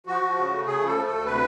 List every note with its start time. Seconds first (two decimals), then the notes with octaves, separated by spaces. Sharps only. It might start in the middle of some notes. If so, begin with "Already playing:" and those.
0.07 F3 F#4
0.21 F3
0.36 C#3
0.51 A3
0.66 C#3 G#4
0.81 F3
0.86 A4
0.95 A3
1.06 D2 A4
1.26 C3 B4